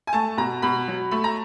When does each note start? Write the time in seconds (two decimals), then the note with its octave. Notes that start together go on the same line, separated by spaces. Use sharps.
0.07 G#5
0.13 A3 A5
0.37 B2 A#5
0.62 B2 B5
0.88 F#3
1.11 A3 B5
1.24 A#5